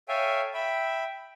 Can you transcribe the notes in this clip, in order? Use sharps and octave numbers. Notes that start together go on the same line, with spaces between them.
A4 C#5 E5 F5 G5 G#5
E5 G5 B5